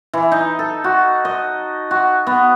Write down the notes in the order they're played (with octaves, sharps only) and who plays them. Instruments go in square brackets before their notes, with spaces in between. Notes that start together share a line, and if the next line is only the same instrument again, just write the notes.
[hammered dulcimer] E3
D#4
A4
F#4
D#5
F#4
B3